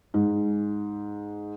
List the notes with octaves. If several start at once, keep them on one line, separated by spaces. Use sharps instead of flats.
G#2